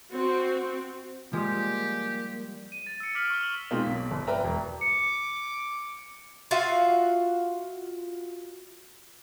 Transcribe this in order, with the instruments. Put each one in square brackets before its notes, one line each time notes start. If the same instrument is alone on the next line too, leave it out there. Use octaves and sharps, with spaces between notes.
[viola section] C4 F#4
[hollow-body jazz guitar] F3 G3 [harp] G#3 [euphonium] A#3 [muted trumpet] G4
[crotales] D#7
A6
E6 C#7
D6 F6 B6 D7 F#7
C#6 G7
F#7
[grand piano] B2 G#3 A#3 C4 D#4 F4
B1 B6
G1
A#4 B4 D5 E5 G5 A#5
E1
[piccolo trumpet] D6 [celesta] C#7
[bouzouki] F4 F#4 E5 F5